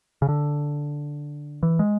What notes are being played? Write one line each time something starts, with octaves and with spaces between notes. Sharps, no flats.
C#3
D3
E3
G#3